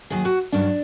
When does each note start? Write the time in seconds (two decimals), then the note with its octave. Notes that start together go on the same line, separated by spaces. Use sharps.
0.10 D#2 D#3 F#3 G#4
0.25 F#4
0.52 G2 D#3 F#3 D4